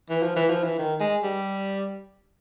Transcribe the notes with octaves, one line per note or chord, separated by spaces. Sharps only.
E3
F3
E3
F3
E3
D#3
G#3
G3